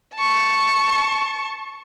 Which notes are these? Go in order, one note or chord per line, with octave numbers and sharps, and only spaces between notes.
A5 C#6